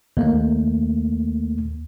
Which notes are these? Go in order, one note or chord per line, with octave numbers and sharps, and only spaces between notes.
D#2 A3 A#3